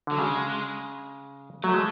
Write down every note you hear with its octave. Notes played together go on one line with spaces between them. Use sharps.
D3 F#3
C#3 G#3
F#3 A3
G#3